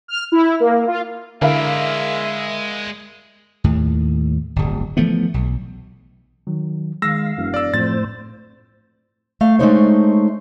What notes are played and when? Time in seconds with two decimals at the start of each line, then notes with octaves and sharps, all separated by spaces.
0.08 F6
0.32 E4
0.60 A#3
0.87 F4
1.42 D3 G#3 E4 A#4 D5 E5 F5
3.64 D#2 A2
4.56 D1 G1
4.97 E3 F3 A3 B3
5.34 B1
6.47 D#3 F#3
7.02 D#3 G#3 F5 E6 A#6
7.38 E1 F#2
7.54 D5 E6
7.74 F2 A2 C5 A6
9.41 A3 F5
9.59 G#3 A3 D4 D#4 C5 C#5